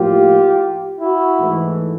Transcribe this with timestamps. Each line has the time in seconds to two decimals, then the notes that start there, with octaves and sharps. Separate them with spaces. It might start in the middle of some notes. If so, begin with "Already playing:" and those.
Already playing: A2 F3 A#3 F4 G4
1.00 E4 F#4
1.39 G#2 E3 A3